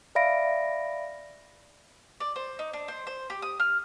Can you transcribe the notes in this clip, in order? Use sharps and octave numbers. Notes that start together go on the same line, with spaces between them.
D5 E5 F5 B5 A#6 D7
D5
C5
D#4
D4
C5
C5
G4
D#6
F6